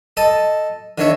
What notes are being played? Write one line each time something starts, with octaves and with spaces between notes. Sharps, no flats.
A4 D#5 A5
D3 D#3 C#5 E5